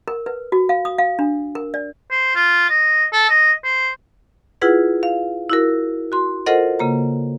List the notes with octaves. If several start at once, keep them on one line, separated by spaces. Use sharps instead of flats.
A#4
B4
F#4
F5
D#6
F5
D4
A#4
D5
C5
F4
D#5
A4
D#5
C5
E4 F4 G#4 B4 F#5
F5
E4 F#4 A#4
F#4 C6
F4 A4 A#4 C5 D#5 F#5
C#3 A#3 A#5